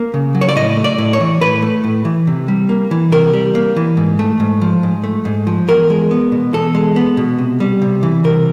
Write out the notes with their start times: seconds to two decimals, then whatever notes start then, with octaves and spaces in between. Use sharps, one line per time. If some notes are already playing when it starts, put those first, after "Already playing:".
Already playing: A#3
0.14 C#3
0.35 F#3
0.41 C#5
0.49 D5
0.56 A2 D#5
0.77 A3
0.84 D5
0.98 A2
1.13 C#5
1.20 E3
1.41 A2 B4
1.62 A3
1.84 A2
2.05 E3
2.27 C3
2.48 G3
2.69 A#3
2.91 E3
3.12 C3 A#4
3.33 G3
3.55 A#3
3.76 E3
3.97 G#2
4.19 A3
4.40 G#2
4.61 F3
4.83 G#2
5.04 A3
5.25 G#2
5.47 F3
5.68 E2 A#4
5.90 G#3
6.11 B3
6.32 B2
6.53 E2 A4
6.75 G#3
6.96 B3
7.17 B2
7.38 C3
7.60 G3
7.82 C3
8.03 E3
8.24 C3 A#4